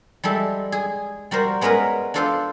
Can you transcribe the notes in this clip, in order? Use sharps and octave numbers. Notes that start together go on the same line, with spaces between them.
G3 G#3 A4 E5
G#4
G3 F#4 A#4 C5
G#3 B3 C#4 A#4 B4
D4 F4 A4 C5 F5 C6